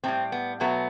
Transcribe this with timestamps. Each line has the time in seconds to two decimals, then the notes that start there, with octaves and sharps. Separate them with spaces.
0.04 A2 G3 C4
0.32 B3
0.60 B2 F#3 A3 B3